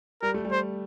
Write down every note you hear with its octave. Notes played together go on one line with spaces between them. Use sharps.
G3 A#4
A3
G3
C5